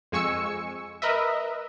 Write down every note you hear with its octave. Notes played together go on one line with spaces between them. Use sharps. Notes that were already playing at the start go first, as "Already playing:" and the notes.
F2 G#3 G#5 C#6 E6 C#7
A#4 B4 D#5 E5